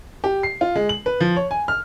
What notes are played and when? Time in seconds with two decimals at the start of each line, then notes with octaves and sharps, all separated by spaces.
0.24 G4
0.43 C7
0.61 F4
0.75 G#3
0.89 F#7
1.06 B4
1.20 F3
1.36 C#5
1.51 G#5
1.68 F6